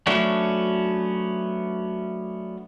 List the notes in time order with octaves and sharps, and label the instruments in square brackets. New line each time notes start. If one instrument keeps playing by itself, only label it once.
[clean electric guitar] F#3 A3 B3 C#4 D4 F#4